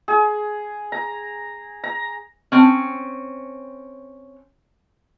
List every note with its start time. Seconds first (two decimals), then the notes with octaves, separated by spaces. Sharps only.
0.08 G#4
0.92 A#5
1.84 A#5
2.52 C4 C#4